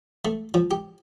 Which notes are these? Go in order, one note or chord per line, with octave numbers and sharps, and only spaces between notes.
A3
F3
G4